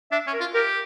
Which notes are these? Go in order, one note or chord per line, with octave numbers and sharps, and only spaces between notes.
D4 E5
C#4
A#4
F4
G4 A#4